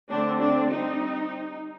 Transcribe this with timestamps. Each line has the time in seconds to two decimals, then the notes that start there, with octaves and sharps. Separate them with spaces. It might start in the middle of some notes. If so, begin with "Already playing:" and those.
0.09 D3 A3 C4 D4
0.41 D4
0.70 G3 C4 D#4